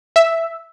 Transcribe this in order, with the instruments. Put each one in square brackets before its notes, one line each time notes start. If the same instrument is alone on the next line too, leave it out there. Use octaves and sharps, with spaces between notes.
[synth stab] E5